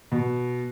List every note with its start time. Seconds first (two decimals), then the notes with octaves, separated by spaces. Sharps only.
0.12 B2